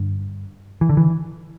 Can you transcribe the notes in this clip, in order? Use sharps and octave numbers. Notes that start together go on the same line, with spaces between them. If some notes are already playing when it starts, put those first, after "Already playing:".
Already playing: G2 D3
E3
D3
E3